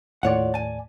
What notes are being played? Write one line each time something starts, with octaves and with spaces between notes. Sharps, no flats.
D#2 A2 F4 C#5 D5 F#5
G#5 A5